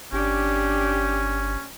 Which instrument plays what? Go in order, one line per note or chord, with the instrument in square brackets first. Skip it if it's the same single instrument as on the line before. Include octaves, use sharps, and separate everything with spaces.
[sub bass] G1 [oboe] C#4 [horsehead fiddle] D4 G4